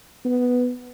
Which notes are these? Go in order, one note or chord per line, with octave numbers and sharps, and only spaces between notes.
B3